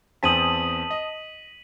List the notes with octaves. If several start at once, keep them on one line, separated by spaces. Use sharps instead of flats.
E2 C4 G#5 A5 D#6 B6 D#7 F#7
D#5